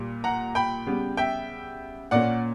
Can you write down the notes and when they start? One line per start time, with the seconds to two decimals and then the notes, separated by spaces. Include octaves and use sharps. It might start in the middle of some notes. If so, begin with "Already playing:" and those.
Already playing: A#2 G3
0.24 F#5 A#5
0.55 G5 B5
0.86 C#3 G3 B3
1.17 E5 G5
2.11 A#2 A#3 C#4 D5 F#5